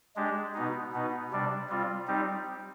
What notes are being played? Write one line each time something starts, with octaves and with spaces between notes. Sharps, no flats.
G#3 D4 G4
B2 B3 D#4
B2 B3 D#4
C3 G3 D4
G3 C4 F4
G3 C4 D#4 G4